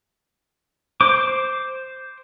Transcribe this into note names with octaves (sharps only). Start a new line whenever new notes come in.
C5 D6